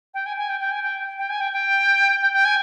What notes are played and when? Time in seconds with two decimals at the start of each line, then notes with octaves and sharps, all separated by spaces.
0.14 G5
0.26 G#5
0.37 G#5
0.49 G5
0.60 G5
0.72 G#5
0.83 G5
1.18 G5
1.30 G#5
1.41 G5
1.53 G5
2.22 G5
2.33 G5
2.45 G#5